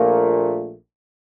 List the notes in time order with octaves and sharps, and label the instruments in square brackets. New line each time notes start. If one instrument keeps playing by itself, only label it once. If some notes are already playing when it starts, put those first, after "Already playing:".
Already playing: [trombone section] A#1 A#2 A3 A#3